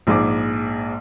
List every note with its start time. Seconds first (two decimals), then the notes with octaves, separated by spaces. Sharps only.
0.07 A#1 G#2 G#4 D6